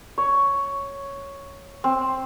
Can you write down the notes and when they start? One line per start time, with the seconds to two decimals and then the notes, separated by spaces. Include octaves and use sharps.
0.18 C#5
1.84 C4